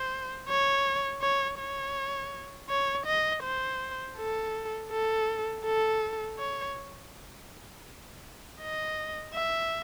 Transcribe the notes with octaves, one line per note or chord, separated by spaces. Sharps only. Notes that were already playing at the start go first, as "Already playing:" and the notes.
Already playing: C5
C#5
C#5
C#5
C#5
D#5
C5
A4
A4
A4
C#5
D#5
E5